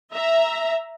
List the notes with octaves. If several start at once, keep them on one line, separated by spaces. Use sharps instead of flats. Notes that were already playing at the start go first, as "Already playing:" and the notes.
E5 A#5